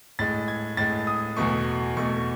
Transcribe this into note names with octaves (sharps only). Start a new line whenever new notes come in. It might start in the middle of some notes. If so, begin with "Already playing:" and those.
A2 G#3 A6
G#6
A2 G#3 A6
D#6
E2 B2 A3 C#6
E2 B2 A3 C#6